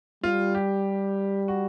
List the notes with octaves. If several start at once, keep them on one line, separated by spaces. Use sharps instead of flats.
G3 F4
G4
F#4